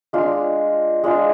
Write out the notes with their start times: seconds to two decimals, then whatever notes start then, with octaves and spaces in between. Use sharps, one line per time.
0.13 G#3 D4 F4
1.04 G#3 D4 F4